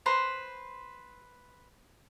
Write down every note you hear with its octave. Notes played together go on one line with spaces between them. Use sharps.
B4 C5 A#5